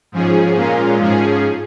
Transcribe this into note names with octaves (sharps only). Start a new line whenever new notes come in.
G#2 F3 C#4 G#4
A#2 G#3 C#4 F4 A#4
G#2 F3 C#4 G#4